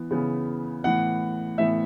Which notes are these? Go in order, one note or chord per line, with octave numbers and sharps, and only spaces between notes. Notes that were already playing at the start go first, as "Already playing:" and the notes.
Already playing: E3 B3
C#3 E3 B3
A2 E3 B3 F#5
A2 E3 B3 E5